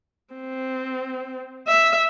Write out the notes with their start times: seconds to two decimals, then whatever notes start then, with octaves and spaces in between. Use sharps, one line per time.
0.34 C4
1.68 E5